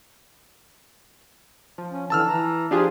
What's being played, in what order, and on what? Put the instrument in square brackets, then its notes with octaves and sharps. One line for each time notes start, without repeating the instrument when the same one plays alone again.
[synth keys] F3
[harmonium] C#4
[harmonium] D3 E3 [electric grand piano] A5 E6 F6
[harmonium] E3 A#5
[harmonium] F3 [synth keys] D4 F4 G#4 [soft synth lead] G4